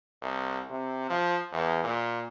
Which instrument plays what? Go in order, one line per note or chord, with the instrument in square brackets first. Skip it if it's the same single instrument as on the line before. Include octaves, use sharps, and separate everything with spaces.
[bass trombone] C2
C3
F3
E2
A#2